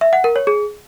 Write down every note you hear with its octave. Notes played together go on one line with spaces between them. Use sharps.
E5
F#5
A#4
C#5
G#4